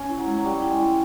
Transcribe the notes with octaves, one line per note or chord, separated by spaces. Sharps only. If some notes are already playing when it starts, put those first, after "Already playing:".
Already playing: C#4
E4
F#3
G#3
F#3
G3 G4
E4
G#3
E4